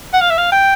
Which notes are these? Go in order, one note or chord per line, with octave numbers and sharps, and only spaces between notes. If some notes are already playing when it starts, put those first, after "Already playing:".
F#5
F5
E5
F5
G5